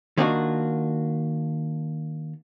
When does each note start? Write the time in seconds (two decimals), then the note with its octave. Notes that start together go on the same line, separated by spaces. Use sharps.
0.17 D#3 A#3 B3 D4 F4 F#4